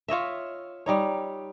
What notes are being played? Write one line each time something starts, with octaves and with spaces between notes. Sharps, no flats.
F4 C#5 D#5 E5
G3 D#4 C#5